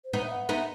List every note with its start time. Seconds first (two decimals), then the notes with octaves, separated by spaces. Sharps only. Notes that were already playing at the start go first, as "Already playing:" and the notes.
0.05 C5
0.13 B3 D#4 B4
0.23 E5
0.31 F#5
0.49 B3 D#4 E5